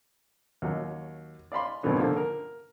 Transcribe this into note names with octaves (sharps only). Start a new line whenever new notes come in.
D#2 F#3
D5 F5 B5 C6
C2 G2 D#3 F#3 B3
D3 F3 A#3
A#4